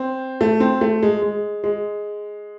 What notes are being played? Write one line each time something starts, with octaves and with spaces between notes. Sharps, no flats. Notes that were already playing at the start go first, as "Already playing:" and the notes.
Already playing: C4
A3
C4
A3
G#3
G#3
G#3